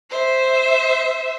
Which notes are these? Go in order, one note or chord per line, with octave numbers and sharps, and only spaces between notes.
C5 E5